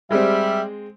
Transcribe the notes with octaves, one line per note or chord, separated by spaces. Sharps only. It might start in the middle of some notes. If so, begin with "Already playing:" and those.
G3 G#3 C4 E5